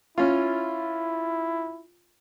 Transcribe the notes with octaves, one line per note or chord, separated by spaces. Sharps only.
C#4 E4 F4